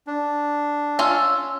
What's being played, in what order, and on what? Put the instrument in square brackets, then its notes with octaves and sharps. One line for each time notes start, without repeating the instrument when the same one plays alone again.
[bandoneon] D4
[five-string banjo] C#4 F4 C#5 [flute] E6